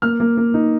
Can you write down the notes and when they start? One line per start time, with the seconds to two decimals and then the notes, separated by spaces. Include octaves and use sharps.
0.02 A#3 F6
0.20 A#3
0.37 A#3
0.54 D#4